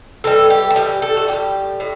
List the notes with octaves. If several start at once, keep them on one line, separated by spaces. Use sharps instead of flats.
A2 E3 G3 A4
G4
A4
A2 E3 G3 G4
A4
F#4
A2 E3 G3 G4
A2